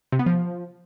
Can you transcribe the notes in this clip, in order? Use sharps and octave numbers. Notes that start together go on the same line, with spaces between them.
C3
B3
F3